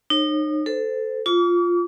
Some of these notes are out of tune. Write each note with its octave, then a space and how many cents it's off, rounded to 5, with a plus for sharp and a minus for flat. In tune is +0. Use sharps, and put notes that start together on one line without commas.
D#4 -35 C#5 -35
A4 +0 C5 -20
F4 +0 D6 -45